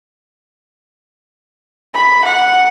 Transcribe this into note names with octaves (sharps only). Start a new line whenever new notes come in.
B5
F#5